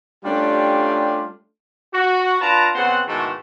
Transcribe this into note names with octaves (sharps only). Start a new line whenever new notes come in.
G3 A3 C#4 D4 F4 G4
F#4
D4 F4 B4 A5 A#5
C#3 B3 C4 C5 F#5
G#2 B2 D#3 E3 A3